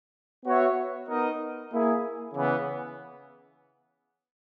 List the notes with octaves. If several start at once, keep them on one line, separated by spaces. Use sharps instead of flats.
B3 F#4 C#5 E5
B3 D#4 A#4 D#5
A#3 E4 G#4
C#3 E3 B3